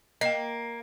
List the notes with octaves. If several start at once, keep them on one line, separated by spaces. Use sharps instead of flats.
A#3 D#5 G5